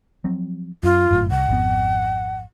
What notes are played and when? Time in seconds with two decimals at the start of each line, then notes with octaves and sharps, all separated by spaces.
0.24 F3 F#3 C4
0.83 F#2 F4
1.11 G1 F#2 A2
1.31 C2 F#5
1.48 G#1 F2 B3